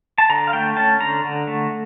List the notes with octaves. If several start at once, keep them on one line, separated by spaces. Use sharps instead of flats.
A5
D3 A#5
F5
A3 G5
C#4 A5
D3 A#5
D3
A3